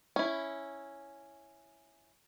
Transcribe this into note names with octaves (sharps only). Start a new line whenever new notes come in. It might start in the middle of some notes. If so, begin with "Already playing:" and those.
C#4 E4